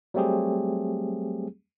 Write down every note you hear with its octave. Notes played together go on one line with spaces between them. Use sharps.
F#3 G3 A3 C4 G4 G#4